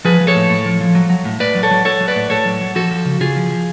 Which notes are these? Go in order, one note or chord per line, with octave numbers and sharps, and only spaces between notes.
F3 G#4 B4
F3
A4 C#5
A2
A2
F3
F3
F#3
F#3
A2
A2 B4 D5
F#3
A4 C#5
F#3
F#3 A4 C#5
F#3
B4 D5
A2
A2 A4 C#5
F#3
F#3
F3 F#4 A4
F3
C#3
C#3 F4 G#4
F3
F3